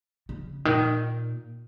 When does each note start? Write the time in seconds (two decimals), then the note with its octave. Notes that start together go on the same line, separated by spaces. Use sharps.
0.29 C#3
0.65 A#2 D#3